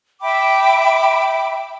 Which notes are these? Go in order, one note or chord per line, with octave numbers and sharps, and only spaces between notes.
E5 G5 B5 D6